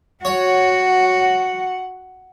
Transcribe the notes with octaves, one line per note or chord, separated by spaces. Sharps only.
F#4 C#5 F#5